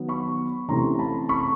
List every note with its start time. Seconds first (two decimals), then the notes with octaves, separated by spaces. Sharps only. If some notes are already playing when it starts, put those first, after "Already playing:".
Already playing: D#3 F#3 B3
0.09 B5 C#6
0.68 C3 E3 A3 C#4 A#5 C6
0.99 A5 B5
1.29 B5 C#6